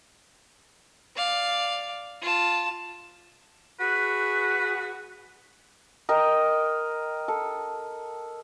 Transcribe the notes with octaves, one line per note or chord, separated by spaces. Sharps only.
D5 F5
F4 A5
F#4 G#4 B4
A#4 D#5 G5
A4